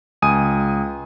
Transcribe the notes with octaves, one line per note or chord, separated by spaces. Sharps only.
C#2 G#5 D#6 D#7